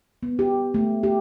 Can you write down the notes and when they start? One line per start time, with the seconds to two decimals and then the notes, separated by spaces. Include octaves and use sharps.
0.23 B3
0.39 G4
0.74 A3
1.03 G4